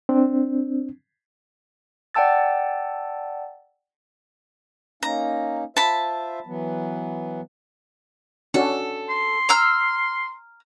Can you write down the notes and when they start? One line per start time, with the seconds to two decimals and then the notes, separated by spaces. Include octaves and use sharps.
0.09 C4 D4
2.15 D5 F#5 G5 A5 E6 A6
5.03 A#3 C#4 D#4 A#5
5.77 F4 C5 E5 A5 B5
6.46 E3 F#3 B3
8.54 C#4 D4 F#4 A4
9.09 C6
9.49 A#5 E6 F6